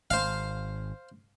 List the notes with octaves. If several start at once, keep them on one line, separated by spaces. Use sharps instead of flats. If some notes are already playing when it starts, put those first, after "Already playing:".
G#1 C5 F5